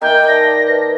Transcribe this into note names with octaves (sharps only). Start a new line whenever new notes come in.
D#3 A#3 D#5 E5 G5 G#5
D5 A5 A#6
B4 E5